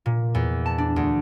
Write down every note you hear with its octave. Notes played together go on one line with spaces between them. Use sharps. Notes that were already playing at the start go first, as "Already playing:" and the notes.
A#2
E2
A5
D4
D2